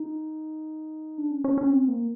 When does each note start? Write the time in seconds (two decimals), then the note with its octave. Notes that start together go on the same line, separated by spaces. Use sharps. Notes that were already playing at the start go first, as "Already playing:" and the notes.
Already playing: D#4
1.18 D4
1.31 C#4
1.44 C#4
1.58 C#4
1.70 C4
1.88 A#3